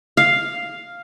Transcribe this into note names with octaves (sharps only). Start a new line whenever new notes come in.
F5